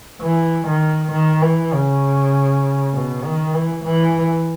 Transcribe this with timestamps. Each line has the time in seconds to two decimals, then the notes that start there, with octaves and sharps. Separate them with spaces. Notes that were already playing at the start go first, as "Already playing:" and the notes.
0.21 E3
0.67 D#3
1.12 D#3
1.42 E3
1.73 C#3
2.94 B2
3.24 D#3
3.54 E3
3.84 E3